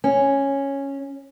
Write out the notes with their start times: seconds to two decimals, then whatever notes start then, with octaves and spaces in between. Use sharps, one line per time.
0.04 C#4